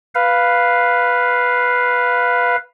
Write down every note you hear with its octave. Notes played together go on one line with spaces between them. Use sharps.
B4 F5